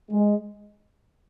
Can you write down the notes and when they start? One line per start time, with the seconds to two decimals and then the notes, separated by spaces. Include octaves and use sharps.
0.10 G#3